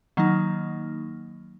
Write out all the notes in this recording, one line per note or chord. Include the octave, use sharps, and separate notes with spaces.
D#3 F#3 A#3 D#4